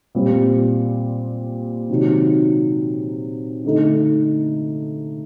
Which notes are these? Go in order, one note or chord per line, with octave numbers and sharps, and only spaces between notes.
A#2 G3 C4
C3 D#3 F#3
D3 A3 D#4